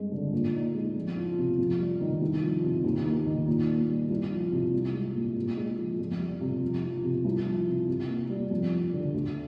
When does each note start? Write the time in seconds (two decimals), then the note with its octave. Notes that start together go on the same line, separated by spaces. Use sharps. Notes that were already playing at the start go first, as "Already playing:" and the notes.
Already playing: G2 G#3 C4
0.12 D3
0.33 A#2
0.53 D#4
0.75 G#3
0.96 F2
1.17 F3
1.38 C3
1.58 F2
1.79 G3
2.01 D#3
2.22 C2
2.42 F3
2.63 C3
2.84 D#2
3.06 A#3
3.26 D#3
3.47 A#2
3.68 A#3
3.89 G3
4.10 C2
4.31 F3
4.52 C3
4.73 C2
4.94 G#3
5.15 A#2
5.36 A#2
5.57 G#3
5.78 F3
5.99 F2
6.20 G3
6.41 C3
6.62 F2
6.83 F3
7.03 C3
7.25 C2
7.46 F3
7.67 C3
7.89 C3
8.09 A#3
8.30 G3
8.51 F2
8.72 F3
8.93 D3
9.14 D2